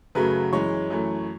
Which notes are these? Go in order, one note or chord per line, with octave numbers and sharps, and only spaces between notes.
F#2 C#3 F#3 A3 B4
F#2 E3 G#3 C#5
F#2 E3 A3